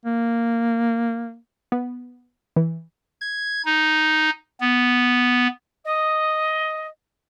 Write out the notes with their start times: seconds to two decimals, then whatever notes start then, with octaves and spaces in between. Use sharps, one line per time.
0.05 A#3
1.72 B3
2.56 E3
3.21 G#6
3.65 D#4
4.60 B3
5.85 D#5